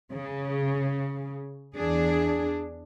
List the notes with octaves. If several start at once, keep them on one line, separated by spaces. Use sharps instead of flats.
C#3
E2 D4 G#4